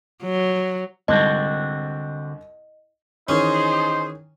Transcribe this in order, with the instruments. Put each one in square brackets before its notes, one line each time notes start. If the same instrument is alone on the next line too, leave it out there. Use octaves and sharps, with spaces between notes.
[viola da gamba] F#3
[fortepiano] C2 G#2 A5 [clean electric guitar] D3 C4 F#4 [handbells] D#5
[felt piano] D#3 E3 [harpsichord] C#4 [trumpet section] D#4 C5 [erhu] G#4